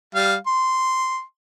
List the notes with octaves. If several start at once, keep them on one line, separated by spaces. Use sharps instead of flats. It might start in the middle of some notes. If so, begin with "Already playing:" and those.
G3 F5
C6